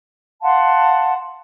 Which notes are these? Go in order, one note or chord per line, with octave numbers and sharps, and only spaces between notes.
F5 F#5 A5 C6